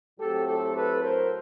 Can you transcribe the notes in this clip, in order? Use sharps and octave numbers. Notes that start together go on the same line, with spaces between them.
A2 F#3 A3 C4 G4 A4
G4 A4
A4 B4
A#4 C5